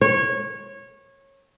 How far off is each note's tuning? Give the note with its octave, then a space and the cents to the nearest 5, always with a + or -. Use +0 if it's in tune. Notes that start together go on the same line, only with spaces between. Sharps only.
C#5 -20